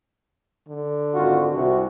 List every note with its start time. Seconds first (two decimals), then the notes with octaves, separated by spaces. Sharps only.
0.68 D3
1.14 G#1 F4 F#4
1.53 C2 F#4